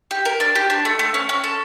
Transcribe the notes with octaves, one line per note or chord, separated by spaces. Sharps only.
G4
A#4
D4
G4
D4
A3
A3
C#4
C#4
A4